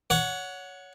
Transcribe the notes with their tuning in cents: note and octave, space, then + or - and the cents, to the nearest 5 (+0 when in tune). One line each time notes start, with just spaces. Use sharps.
C#5 +20 F#5 -10